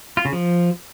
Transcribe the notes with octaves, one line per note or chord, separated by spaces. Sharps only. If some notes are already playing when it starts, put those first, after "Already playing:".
F4
C#3
F3